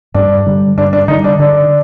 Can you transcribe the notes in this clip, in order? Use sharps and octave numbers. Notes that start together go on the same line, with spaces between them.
G2 D4
D3 G3
G2 D4
D4
D3 G3 D#4
D4
D3 D4